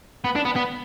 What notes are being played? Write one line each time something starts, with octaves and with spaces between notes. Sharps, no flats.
B3
D4
B3
B3